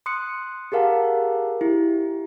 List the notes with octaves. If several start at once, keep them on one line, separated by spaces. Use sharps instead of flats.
C6 D#6 F#6 C#7
G4 G#4 A#4 F5 F#5 A5
E4 G4